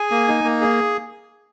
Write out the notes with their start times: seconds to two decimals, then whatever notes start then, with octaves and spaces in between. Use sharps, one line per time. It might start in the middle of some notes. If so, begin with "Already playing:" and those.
Already playing: G#4 G#5
0.11 A#3
0.28 D#4
0.44 A#3
0.61 G#4